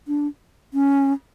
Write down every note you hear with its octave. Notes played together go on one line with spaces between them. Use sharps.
D4
C#4